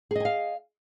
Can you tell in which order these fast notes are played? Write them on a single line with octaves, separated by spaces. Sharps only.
G#4 D#5 G#5 F5